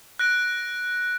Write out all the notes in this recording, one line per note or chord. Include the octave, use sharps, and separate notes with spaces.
F#6 A#6 D7